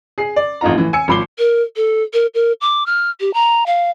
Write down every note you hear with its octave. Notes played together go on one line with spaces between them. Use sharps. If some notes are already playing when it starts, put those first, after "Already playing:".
G#4 C7
D5
A1 F2 D#4 F4 A#5
A2 E3
G#5 E6 C#7
G#1 F3 B5 D6 C7 G7
A#4
A4
A#4
A#4
D6
F6
G4
A#5
F5